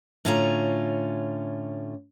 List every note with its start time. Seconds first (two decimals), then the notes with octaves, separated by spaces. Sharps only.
0.25 A2 D3 C#4 F4 A5 A#5